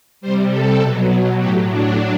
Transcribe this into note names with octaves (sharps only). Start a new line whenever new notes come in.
C3 G3 C5
A4
B2 F#3
A2 F#3 G4
D4